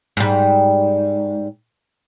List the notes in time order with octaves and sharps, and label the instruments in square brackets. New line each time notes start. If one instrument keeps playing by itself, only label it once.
[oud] G#2 G3